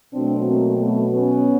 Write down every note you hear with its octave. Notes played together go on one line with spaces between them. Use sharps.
B2 F#3 A3 C4 D4
A#3 C4
A3 B3
B3 C#4